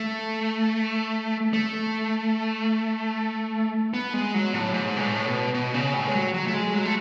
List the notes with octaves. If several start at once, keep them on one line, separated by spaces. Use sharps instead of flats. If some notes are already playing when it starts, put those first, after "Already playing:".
Already playing: A3
A3
B3
G#3
F#3
A2
G#2
B2
A2
B2
B2
C#3
A2
G#3
F#3
F#3
A3
G#3
F#3
A3